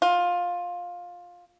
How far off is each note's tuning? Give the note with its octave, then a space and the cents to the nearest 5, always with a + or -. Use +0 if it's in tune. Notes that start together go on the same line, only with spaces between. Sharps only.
F4 +15